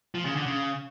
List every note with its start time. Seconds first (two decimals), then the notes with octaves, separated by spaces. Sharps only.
0.15 F3
0.25 C#3
0.36 D3
0.46 C#3